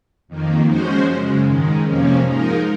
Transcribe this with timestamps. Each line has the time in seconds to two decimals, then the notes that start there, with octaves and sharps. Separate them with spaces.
0.28 F2 D#3 A#3
0.67 F3 G#3 C#4 F#4 C5
1.05 F#2 C#3 G#3
1.46 G#2 D#3 G#3
1.84 F2 C3 F3 A#3 C#4
2.24 G#2 F3 G#3 D#4 A#4